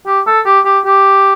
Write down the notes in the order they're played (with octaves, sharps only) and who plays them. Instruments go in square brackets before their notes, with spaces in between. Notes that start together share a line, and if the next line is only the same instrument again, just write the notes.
[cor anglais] G4
A4
G4
G4
G4